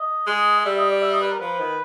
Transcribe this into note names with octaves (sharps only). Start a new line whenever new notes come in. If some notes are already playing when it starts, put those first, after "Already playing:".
Already playing: D#5
G#3
D#5
G3 E5
D#5
D5
E5
D#5
B4
A#4
F3 B4
D#3